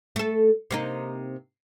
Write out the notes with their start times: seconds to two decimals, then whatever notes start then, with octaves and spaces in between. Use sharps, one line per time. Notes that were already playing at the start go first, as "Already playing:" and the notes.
0.16 A3 A4
0.71 C3 A#3 D#4